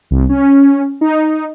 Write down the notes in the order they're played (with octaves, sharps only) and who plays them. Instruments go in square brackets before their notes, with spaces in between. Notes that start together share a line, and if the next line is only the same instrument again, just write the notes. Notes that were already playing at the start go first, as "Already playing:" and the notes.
[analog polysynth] C2
C#4
D#4